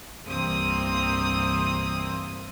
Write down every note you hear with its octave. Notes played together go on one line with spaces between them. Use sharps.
C2 G2 E3 A#3 C4 D#6